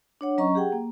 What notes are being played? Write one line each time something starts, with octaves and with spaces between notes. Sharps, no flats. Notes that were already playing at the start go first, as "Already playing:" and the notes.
D4 C#5 F#5
F#3 C#4 D#5 A#5 C#6
G4 G#4 F#5 G5
A#3